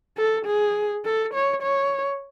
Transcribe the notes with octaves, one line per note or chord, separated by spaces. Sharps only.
A4
G#4
A4
C#5
C#5